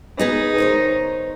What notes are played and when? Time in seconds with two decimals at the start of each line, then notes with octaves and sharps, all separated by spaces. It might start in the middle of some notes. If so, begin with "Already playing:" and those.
0.19 B3 D#4 G#4 B4
0.58 D#3 C5 C#5